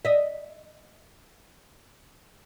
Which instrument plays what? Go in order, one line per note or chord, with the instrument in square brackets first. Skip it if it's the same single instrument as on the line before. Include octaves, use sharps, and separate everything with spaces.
[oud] D#5 E5